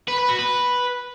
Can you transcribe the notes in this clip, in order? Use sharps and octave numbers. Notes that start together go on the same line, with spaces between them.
B4
B4
F#4
B4